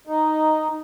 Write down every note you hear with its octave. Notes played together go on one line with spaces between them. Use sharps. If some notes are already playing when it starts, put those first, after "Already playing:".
D#4